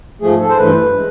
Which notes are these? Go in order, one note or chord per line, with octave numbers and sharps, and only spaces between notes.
G#2 F3 A3 G#4
A4
C5
G2 E3 A3 B4
G#3